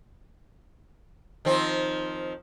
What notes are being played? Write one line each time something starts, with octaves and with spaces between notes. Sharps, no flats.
D#3 F3 C4